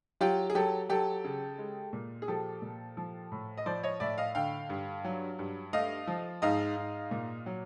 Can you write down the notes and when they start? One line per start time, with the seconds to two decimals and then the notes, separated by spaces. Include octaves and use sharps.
0.21 F#3 F4 G4
0.50 G#4
0.55 F#3 G4 A4
0.89 F#3 G4 A4
1.24 C#3
1.58 G#3
1.93 A#2
2.22 G#4
2.28 F3 G4 A4
2.62 A#2
2.97 F3
3.32 A2
3.57 D#5
3.66 F3 C5 D5
3.83 C#5 D#5
4.00 A2 D5 E5
4.18 D#5 F5
4.35 D3 F5 G5
4.70 G2
5.05 F#3
5.39 G2
5.73 A3 D#5 F5
6.07 F3
6.42 G#2 D#5 F5
6.76 G#2
7.11 A#2
7.46 F#3